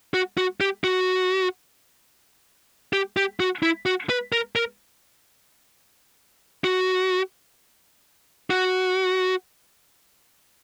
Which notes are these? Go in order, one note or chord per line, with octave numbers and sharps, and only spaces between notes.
F#4
F#4
G4
F#4
G4
G4
F#4
E4
F#4
B4
A#4
A#4
F#4
F#4